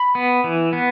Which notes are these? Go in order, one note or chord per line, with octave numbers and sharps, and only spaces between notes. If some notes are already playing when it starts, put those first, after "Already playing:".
Already playing: B5
B3
E3
B3